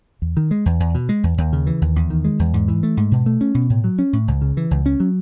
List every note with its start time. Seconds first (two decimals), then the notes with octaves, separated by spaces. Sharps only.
0.22 E2
0.37 D#3
0.51 G#3
0.66 E2
0.80 E2
0.95 B2
1.09 G#3
1.24 E2
1.38 D#2
1.53 C#3
1.67 E3
1.82 D#2
1.96 E2
2.10 D#3
2.25 G#3
2.39 E2
2.54 G#2
2.68 E3
2.83 A3
2.97 G#2
3.12 B2
3.26 A3
3.41 C#4
3.55 B2
3.70 A2
3.84 F#3
3.99 C#4
4.13 A2
4.28 C#2
4.42 C#3
4.57 E3
4.71 C#2
4.86 C#4
5.00 F#3